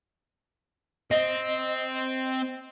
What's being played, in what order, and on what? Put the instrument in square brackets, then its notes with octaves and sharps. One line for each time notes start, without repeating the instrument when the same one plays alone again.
[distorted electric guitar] C4 [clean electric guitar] D#5